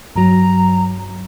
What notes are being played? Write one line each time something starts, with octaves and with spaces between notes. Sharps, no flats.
G2 F#3 A#5